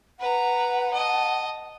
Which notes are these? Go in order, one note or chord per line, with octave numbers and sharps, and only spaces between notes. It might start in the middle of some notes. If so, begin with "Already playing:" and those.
B4 F#5 A#5
D#5 A5